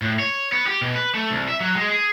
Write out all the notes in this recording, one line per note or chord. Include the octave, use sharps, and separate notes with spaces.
A2
C#5
B3
G4
B2
B4
A3
C2
E5
F#3
G#3
G#4